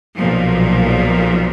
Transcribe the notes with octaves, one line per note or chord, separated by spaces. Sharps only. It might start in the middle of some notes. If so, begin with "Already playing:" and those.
B1 A#2 F3